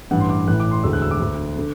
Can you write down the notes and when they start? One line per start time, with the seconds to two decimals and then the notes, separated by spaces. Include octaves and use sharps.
0.11 A1 G2 E3 F#5
0.20 C6
0.30 D6
0.47 A1 A2 E3 F#6
0.60 D6
0.71 C6
0.84 E1 D2 D3 E6
0.93 F#6
1.02 E6
1.11 D6
1.20 D2 D3
1.58 D3